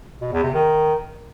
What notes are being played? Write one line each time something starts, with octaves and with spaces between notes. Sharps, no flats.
B2
E2
C3
D#3